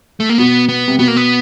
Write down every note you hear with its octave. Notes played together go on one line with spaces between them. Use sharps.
A3
A#3
B2 B3
B3
C3
B2 B3
A#3
B3